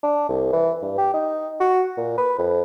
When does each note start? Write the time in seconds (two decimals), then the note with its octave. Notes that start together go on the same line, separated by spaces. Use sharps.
0.03 D4
0.29 C2
0.53 E3
0.83 G2
0.98 G4
1.14 D#4
1.61 F#4
1.98 A#2
2.18 B4
2.39 F2